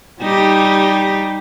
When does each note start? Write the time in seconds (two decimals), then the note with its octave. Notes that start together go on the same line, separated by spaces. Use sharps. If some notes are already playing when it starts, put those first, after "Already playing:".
0.21 G3 D#4 G4